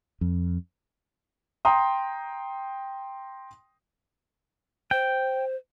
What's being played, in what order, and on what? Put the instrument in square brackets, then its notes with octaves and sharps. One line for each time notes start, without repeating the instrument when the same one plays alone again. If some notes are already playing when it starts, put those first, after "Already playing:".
[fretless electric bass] F2
[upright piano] G5 A#5 C6 D#6
[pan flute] C5 [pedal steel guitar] G5